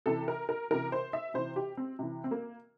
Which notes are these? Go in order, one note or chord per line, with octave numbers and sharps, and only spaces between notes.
C3 E3 A4
A#4
A#4
C3 E3 A#4
C5
E5
C3 E3 C5
G4
C4
C3 E3
C4
A#3